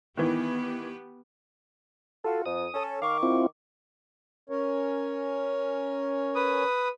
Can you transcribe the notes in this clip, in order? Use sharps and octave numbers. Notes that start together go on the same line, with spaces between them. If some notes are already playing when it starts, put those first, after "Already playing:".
D#3 E3 B3 G4 B4
F4 F#4 A4
F2 D#6
C#4 A4
D#3 F5 C#6 D6
C4 E4 F4
C#4 A#4 C#5
B4 D#6